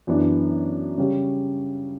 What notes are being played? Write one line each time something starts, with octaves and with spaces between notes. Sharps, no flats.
F#2 E3 B3 D4
C#3 G3 C#4